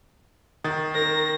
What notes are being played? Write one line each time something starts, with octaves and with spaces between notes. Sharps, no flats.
D#3 D#6 A6
A#4 A#6